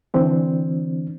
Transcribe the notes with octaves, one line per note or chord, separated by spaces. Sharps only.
D3 E3 C4 D4